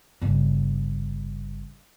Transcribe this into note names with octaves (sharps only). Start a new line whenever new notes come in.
G1 C#3